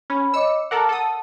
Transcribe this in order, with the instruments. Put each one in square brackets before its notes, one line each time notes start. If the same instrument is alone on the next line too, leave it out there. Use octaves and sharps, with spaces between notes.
[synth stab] C#4 [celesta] B5
[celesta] C#5 D#5 D6 [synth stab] E6 C#7
[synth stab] A4 A#4 F#5 [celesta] A5 D6
[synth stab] A4 D#6 [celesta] F#5 A5